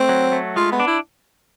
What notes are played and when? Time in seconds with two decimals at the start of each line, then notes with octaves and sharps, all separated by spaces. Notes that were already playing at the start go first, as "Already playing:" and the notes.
Already playing: A3 C4
0.09 F#3
0.32 A3
0.56 G#3 F4
0.72 B3
0.80 D4
0.87 E4